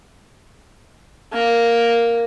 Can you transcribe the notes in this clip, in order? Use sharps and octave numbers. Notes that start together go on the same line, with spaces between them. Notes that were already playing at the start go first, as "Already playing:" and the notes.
A#3